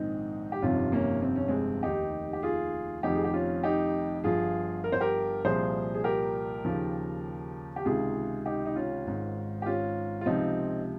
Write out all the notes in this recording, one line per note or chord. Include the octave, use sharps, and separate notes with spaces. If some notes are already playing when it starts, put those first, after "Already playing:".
Already playing: A#1 G#2 D#3 C4 D#4
G4
G1 F2 C3 D#3 C#4 F4
A#3 C#4
C4
C#4
G#3 C4
F1 D#2 D#3 D#4 G4
G4
F4 G#4
F1 F2 D#3 D#4 G4
G#4
G4
C#4 F4
D#4 G4
G1 G2 F3 F4 G#4
A#4
C5
G4 A#4
C2 A#2 F3 G#4 C5
G#4
G4 A#4
D#2 C#3 F3
G4
C#2 C3 D#3 F4 G#4
D#4 G4
D#4
C#4 F4
G#1 G#2 D#3
G4
C#4 F4
F4
C#2 C3 F3 C4 D#4